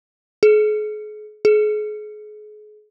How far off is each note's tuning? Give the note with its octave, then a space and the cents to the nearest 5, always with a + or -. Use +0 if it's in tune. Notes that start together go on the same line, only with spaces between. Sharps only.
G#4 +40
G#4 +35